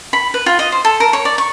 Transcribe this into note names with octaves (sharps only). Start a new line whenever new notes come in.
B5
B4
F4
D#5
C5
A4
A#4
C#5
D5
C#6